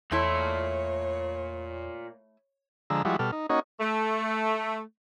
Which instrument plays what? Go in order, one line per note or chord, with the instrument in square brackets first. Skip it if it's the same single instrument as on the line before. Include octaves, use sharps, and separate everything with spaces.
[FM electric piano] E2 [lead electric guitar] A#2 C6 [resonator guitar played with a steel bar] A3 E4 A4 [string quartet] C#5
[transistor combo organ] D3 F3 G#3 A#5 E6
F3 G3 G#3 E4 F#4
B2 G3 A4 F6
D#4
A#3 C#4 D#4 F#4 C#5 D#5
[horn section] A3